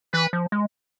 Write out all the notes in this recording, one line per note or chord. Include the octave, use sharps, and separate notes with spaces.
E3 B4
F3
G#3